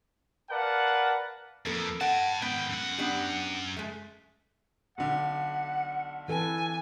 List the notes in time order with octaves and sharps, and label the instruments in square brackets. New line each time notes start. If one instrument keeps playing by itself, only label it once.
[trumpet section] A#4 B4 D5 F5 F#5 A5
[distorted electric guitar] F2 [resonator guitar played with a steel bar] A#3 A4 B4
[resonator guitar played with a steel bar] F#5 [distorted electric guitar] G5 A5
[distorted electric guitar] G#2 G5 [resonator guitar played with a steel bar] B3
[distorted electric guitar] F#2 F#5
[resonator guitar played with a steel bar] B3 D4 G4
G#3 A3
[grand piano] B1 D3 [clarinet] F#5
[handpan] E3 A4 B4 [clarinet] C4 [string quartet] G#5